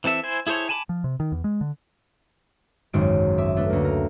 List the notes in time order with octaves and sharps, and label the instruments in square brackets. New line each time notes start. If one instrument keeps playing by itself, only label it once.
[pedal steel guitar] E3 C4 A4 E5
E4 C5 G#5
E4 G#4 A4 C5 C#5
G#5 A5 B5 C#6 D6
[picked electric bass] F3
C3
D#3
E2
G#3
D3
[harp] G#1 C#2 F#2 G#3 F#4 D7
G#4 E5 D6
A3 D4 B4
D2 A#3
A#4